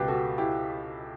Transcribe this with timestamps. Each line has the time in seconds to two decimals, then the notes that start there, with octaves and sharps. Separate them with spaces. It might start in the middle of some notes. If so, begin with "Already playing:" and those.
Already playing: C#2 B2 G4 B4
0.08 F#4 A4
0.38 E4 G4